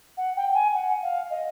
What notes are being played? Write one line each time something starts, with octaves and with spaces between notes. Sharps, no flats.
F#5
G5
G5
G#5
F#5
F5
D#5